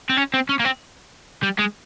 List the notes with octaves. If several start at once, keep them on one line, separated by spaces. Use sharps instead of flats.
C4
C#4
C4
C#4
A#3
C4
G3
G#3